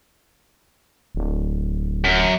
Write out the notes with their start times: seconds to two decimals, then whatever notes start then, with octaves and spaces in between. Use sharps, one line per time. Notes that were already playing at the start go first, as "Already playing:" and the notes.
1.15 D1
2.04 F#2